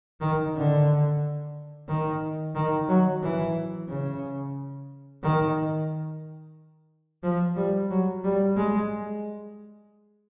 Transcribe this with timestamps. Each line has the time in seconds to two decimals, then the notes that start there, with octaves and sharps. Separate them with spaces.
0.21 D#3
0.55 D3
1.88 D#3
2.55 D#3
2.89 F#3
3.23 E3
3.88 C#3
5.23 D#3
7.23 F3
7.56 G3
7.90 F#3
8.24 G3
8.56 G#3